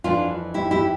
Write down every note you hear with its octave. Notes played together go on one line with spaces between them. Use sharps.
F2 E3 D4 F4
E4 G4
E4 G4